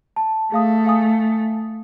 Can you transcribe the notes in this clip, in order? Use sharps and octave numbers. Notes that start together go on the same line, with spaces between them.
A5
A3 G#4 F5 D#6
F5 G#5 D#6